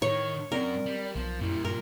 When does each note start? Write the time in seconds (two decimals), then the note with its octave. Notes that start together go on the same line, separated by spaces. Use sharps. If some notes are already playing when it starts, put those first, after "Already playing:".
0.02 A2 D#3 C#5
0.52 F#2 C4 A#4 D5
0.86 G3
1.15 B1 F3 B3
1.41 F#2 A#2 G3 E4
1.65 G2 F4 A#4